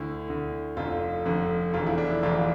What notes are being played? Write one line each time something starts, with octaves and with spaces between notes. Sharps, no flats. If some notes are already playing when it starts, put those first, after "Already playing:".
Already playing: D2 D3 E4
D2 D3
F1 F2 D3 F4
F1 F2 D3
F1 E2 D3 F4
E4
D4
E4
F1 E2 D3 F4